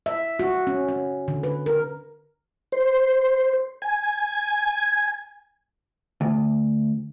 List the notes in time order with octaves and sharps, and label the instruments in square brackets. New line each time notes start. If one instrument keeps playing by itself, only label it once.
[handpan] E5
F#4
C#4
C#4
D3
B4
A#4
[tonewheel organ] C5
G#5
[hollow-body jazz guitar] D2